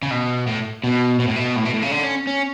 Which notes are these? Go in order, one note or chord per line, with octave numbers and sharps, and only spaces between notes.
C#3
B2
A2
B2
B2
A2
B2
A2
B2
A2
C#3
D3
C#4
C#4